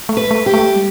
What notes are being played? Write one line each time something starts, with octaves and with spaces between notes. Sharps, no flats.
A3
B4
A3
G4
A3
G3